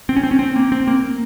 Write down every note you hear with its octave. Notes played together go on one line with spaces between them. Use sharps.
C4
C#4
C4
C#4
C4
A#3
C4
A#3